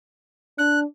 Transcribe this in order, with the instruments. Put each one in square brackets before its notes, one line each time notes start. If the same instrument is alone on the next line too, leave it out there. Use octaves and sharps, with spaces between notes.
[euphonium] D4 [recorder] F#6